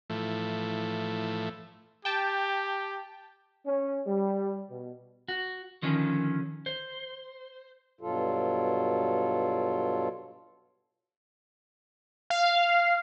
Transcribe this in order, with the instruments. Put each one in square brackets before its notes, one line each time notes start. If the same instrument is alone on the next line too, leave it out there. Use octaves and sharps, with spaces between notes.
[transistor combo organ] A2 E3 F3 A3
[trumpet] G4 [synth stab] G5 A5
[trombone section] C#4
G3
B2
[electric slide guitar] F#4
D3 D#3 F3 C#4
C5
[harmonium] G2 B2 F#3 F4 A4
[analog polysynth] F5